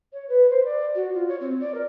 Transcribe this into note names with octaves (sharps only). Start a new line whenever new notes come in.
C#5
B4
C5
D5
F#4
F4
C#5
C4
D5
A#4